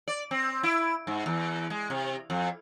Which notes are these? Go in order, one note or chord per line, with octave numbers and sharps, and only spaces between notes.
D5
C4
E4
G#2
E2
G#3
C3
F2